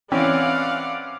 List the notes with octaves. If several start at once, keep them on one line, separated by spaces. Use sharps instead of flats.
E3 C4 C#4 D5 F5 F#5